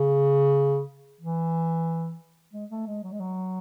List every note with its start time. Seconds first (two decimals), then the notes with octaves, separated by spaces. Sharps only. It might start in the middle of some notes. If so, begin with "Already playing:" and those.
Already playing: C#3
1.21 E3
2.53 G#3
2.70 A3
2.87 G#3
3.03 F#3
3.12 G#3
3.20 F#3